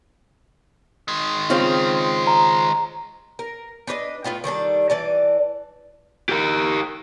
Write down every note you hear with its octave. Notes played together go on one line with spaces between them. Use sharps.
D#3 G#3
C#3 C4 F4
A#5
A#4
D4 B4 C#5 D#5
A2 B3 F4 G5
D#3 G3 D4 A4
E3 D5 A5
G4 A#4